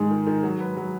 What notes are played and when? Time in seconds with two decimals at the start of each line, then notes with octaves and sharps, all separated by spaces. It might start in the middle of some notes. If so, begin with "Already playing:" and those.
Already playing: G#2 D#3 G#3
0.11 D#3
0.27 D#3
0.43 F#3
0.61 B4
0.77 F#3